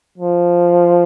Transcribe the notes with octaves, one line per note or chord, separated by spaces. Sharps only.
F3